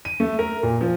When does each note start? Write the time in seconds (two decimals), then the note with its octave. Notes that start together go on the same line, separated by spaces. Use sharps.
0.05 D#7
0.20 A3
0.39 A#4
0.63 A#2
0.81 F3